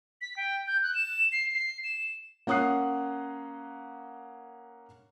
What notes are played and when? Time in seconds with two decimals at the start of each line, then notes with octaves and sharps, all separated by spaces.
0.21 B6
0.37 G5
0.67 G6
0.83 F#6
0.95 E7
1.32 C7
1.54 C7
1.84 E7
2.47 A#3 C#4 F#5 D#6 F#6 C7